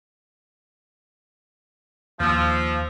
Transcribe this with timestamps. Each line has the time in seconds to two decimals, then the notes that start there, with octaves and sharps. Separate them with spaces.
2.20 D#2 F3 E6